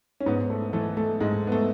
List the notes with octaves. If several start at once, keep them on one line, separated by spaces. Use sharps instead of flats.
C#4
G#2 B3
A3
E3 A3
A3
G#2 G#3
B3
A3